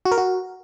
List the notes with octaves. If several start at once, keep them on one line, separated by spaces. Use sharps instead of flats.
F#4
A#4
F#4